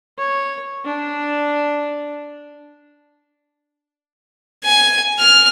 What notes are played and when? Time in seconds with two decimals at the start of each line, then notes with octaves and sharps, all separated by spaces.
0.19 C#5
0.85 D4
4.64 G#5
5.19 F6